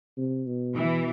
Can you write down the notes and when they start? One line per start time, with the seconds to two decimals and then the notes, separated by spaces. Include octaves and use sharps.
0.17 C3
0.46 B2
0.76 E3